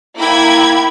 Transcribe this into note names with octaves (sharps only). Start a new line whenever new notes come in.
A#3 E4 G5 B5 G#6